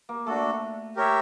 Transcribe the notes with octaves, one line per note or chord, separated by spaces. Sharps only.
A#3
A3 D4 F#4 A4
G4 A#4 C#5 E5